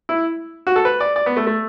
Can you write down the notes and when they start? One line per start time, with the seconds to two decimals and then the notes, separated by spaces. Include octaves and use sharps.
0.09 E4
0.67 F#4
0.76 A4
0.85 B4
1.00 D5
1.16 D5
1.26 B3
1.37 A3
1.47 A3